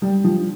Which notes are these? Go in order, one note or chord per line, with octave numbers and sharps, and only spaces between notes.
G3
F3